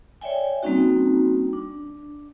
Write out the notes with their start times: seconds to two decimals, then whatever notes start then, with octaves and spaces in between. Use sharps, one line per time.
0.21 C#5 D5 E5 G5 G#5
0.63 G3 A#3 C4 C#4 D#4 F#4
1.53 D4